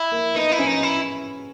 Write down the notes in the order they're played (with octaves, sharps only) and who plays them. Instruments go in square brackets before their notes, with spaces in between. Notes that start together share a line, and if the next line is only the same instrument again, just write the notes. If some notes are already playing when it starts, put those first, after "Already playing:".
Already playing: [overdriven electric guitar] E4
[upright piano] A#3
[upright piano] B3 [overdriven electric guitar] D#4
[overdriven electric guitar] E4
[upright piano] C#4
[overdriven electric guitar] D#4
E4